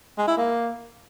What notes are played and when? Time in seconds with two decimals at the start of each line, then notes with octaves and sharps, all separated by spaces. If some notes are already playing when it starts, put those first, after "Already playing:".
0.18 G#3
0.28 E4
0.37 A#3